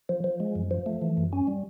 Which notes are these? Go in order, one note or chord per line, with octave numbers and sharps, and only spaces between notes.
F3
F3
G#3
F#2
F3
A3
E3
F#2
C#4
G3